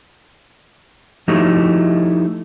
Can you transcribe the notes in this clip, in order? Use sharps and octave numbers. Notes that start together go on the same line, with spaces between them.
F3 A3 D#4 E4 F#4 G4